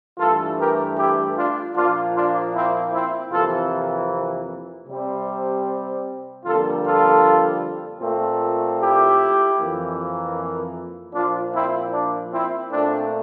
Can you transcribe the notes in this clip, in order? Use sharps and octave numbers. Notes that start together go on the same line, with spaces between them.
G2 E3 A3 F4 A4
G4 A#4
E4 G4
D4 F4
A#2 F3 A#3 D4 F4
D4 F4
C4 E4
C4 E4
F2 C3 E3 A#3 F4 A4
C3 G3 C4
F2 D3 G3 A#3 F4 A4
F4 A4
A#2 A3 C4
E4 G4
F2 E3 A#3
A#2 F3 A#3 D4 F4
C4 E4
D4
C4 E4
A#2 A3 C4 D4